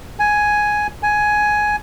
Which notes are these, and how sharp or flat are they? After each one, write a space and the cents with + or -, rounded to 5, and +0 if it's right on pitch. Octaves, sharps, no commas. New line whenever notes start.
G#5 +5
G#5 +10